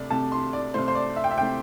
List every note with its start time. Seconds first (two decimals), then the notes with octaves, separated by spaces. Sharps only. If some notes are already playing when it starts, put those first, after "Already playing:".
Already playing: C2 C3 A3 D5
0.10 C2 C3 A3 A5
0.32 C6
0.53 D5
0.74 C2 C3 A3 C5
0.88 C5
0.95 D5
1.16 E5
1.24 G5
1.31 E5
1.38 C3 A3 G5